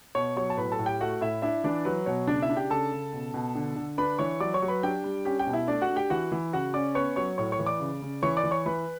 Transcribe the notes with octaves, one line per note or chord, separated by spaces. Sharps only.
B2 C#5 C#6
F#3 C#5 C#6
A5
A2 B4 B5
A4 A5
A2
G4 G5
A3 F#4 F#5
A2 E4 E5
D4 E4 E5
E3 D4 D5
F#3 B4
B2 C#5
C#3 D4 D5
E4 E5
D4
G4 G5
C#3 A4 A5
C#3
B2
B2
D3
D3
D4 B4 B5
E3 C#5 C#6
F#3 D5 D6
C#5 C#6
F#3
B4 B5
D4 G4 G5
G3
C#4 G4 G5
G4 G5
B2
E4 E5
A3 D4 D5
F#4 F#5
D4
G4 G5
E3 F#4 F#5
E3
C#3 F#4 F#5
C#4 D5 D6
B3 C#5 C#6
F#3 C#5 C#6
A2 C#5 C#6
C#5 C#6
E3
D5 D6
C#3
C#3
E3 C#5 C#6
D5 D6
E3
C#5 C#6
E3 B4 B5